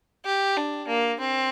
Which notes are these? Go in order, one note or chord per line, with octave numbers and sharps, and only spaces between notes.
G4
D4
A#3
C4